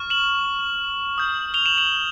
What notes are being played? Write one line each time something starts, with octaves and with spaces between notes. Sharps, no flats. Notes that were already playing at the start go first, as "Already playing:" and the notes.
Already playing: C#6 F6
E7 F#7
D#6 G6
F7 G7
E7 F#7
E7 F#7